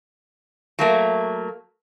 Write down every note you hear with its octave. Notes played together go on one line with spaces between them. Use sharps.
F#3 A3 A#3